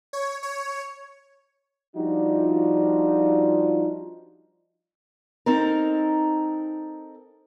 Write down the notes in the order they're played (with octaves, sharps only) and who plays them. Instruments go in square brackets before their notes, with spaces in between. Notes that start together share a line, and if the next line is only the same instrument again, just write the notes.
[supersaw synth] C#5
C#5
[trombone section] F3 G3 D4 D#4 F4 F#4
[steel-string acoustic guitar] C4 D#4 A4 A#4